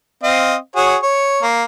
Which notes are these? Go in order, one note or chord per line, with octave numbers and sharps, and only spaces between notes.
C4 D#5 F5
F#4 G#4 C#5
C#5
A#3